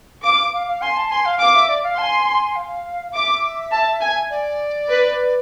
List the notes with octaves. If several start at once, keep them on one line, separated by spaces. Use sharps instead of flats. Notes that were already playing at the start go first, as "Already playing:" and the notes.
F5 D6
F5
F5
G#5 C6
A5
G#5 C6
F5
F5 D6
E5
D5
F5
G#5 A5 C6
G#5
F5
E5 D6
A5
G#5
D5
B4